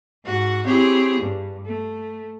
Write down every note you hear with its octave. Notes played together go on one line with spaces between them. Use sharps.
G#2 F#4 F#5
C4 E4 G4 G#4 C#5
G2
A3